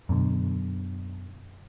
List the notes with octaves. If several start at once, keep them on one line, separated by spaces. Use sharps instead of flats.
F#2 B2 D3